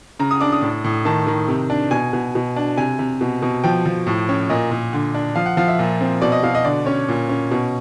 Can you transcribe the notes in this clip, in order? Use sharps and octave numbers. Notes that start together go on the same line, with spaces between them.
C#3 A#5
D#6
D4 D6
D#6
A2
A2
D#3 A5
D#3
C3
D4
B2 G#5
B2
B2
D4
C3 G#5
C3
B2
B2
F3 G5
F3
A2
C#4
A#2 D#5
A#2
D3
D4
F3 F5
F#5
F3 F5
E5
A#2
C4
B2 D5
D#5
B2 F5
D#5
D3 D5
C#4 C#5
A#2
C#4
B2